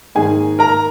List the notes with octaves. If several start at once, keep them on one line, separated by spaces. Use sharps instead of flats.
G#2 D#3 A#3 G#4 G#5
A#4 A#5